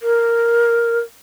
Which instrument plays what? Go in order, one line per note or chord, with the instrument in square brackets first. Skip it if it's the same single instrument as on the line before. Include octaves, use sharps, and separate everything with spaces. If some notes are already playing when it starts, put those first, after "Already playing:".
[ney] A#4